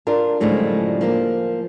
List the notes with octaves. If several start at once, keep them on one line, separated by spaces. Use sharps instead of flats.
D4 F4 A#4
F#2 A2 D3 F3 G3 G#3
F3 A#3 A#4